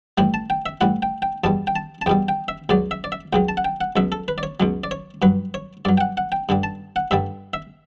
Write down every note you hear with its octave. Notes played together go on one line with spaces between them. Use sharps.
A2 E3 G3 G5
A5
G5
E5
A2 E3 G3 F#5
G5
G5
E2 B2 G3 A5
G5
A5
A5
E2 B2 G3 G5
G5
E5
C#2 C#3 F#3 D5
E5
D5
E5
C#2 C#3 F#3 G5
A5
F#5
G5
F#5
C#2 B2 F#3 E5
A4
B4
D5
C#5
C#2 B2 F#3
D5
C#5
G2 F#3 B4
C#5
G2 F#3 D5
G5
F#5
F#5
G5
G2 D3 G3
A5
F#5
G2 D3 G3 E5
E5